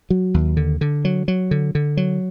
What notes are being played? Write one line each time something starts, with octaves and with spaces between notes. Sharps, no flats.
F#3
D#2
D3
D3
F#3
F#3
D3
D3
F#3